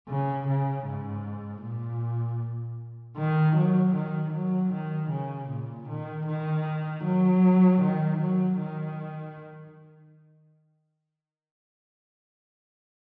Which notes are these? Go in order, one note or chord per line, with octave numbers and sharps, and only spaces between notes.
C#3
C#3
G#2
A#2
D#3
F#3
D#3
F#3
D#3
C#3
A#2
D#3
D#3
F#3
D#3
F#3
D#3